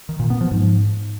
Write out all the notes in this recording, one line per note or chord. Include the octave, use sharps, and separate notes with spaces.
D#3
A#2
B3
F3
G#2